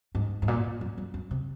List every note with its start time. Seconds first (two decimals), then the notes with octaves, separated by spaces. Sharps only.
0.15 G#2
0.42 G#2
0.48 A#2
0.81 F#2
0.98 F#2
1.14 F#2
1.31 C3